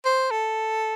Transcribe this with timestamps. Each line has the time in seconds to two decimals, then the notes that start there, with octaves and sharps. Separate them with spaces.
0.05 C5
0.31 A4